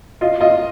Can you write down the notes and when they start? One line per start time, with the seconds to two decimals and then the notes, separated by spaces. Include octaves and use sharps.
0.21 F4 D#5
0.41 F4 D#5